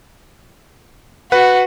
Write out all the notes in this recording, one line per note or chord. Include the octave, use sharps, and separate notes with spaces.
F#4 B4 F#5